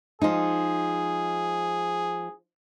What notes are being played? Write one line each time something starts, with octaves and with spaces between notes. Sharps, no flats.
F3 G#3 D#4 G#4